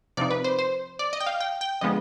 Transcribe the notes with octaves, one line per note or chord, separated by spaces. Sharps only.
C3 F3 C4 D#4 D5
B4
C5
C5
D5
D#5
G5
F5
G5
G5
D3 F3 G#3 B3 D#5